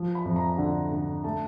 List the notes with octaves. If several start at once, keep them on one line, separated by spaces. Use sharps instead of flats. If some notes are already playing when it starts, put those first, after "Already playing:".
Already playing: F3
B5
F2
A#5
D3
D3
A3 A5